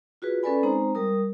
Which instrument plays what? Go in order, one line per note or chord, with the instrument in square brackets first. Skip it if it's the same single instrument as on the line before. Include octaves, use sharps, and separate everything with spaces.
[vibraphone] F4 F#4 G#4 B4
C#4 A4 B4 D5 G#5 B5
G#3 C4 D#4 C5 A#5
G3 A#4 D#6